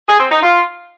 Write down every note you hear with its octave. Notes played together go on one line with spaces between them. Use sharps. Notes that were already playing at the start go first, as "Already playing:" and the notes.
G#4
C4
D#4
F4